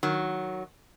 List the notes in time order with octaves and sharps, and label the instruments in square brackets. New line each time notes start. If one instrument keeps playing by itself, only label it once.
[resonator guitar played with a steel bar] D#3 F#3